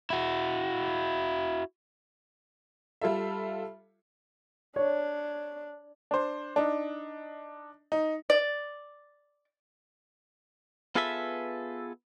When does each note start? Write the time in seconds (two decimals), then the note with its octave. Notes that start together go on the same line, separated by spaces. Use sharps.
0.10 E4 F#4
3.01 G3 F4 A4 E5
4.76 D4 C#5
6.11 D4 C5
6.56 D4 D#4
7.92 D#4
8.30 D5
10.95 B3 F4 G#4 A4 B4 E5